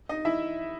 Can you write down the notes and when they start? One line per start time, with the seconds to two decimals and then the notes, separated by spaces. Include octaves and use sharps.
0.09 D#4 D#5
0.25 E4 E5